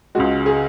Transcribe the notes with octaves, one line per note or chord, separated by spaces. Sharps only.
C#2 C#3 G#3 F#4
G#4